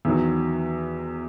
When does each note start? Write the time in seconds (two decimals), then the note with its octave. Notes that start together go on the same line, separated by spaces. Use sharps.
0.05 E2 D#3 F#3